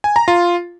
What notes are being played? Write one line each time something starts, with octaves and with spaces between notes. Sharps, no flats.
G#5
A#5
F4